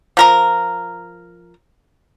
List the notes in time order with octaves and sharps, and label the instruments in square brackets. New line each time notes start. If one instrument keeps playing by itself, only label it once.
[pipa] F3 A#4 A#5